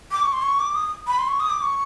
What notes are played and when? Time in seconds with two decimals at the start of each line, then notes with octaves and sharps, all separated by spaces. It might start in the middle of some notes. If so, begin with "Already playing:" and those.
0.11 D6
0.22 C#6
0.33 C6
0.43 C#6
0.60 D6
0.75 D#6
1.07 B5
1.18 C6
1.28 C#6
1.40 D#6
1.50 D6
1.61 C#6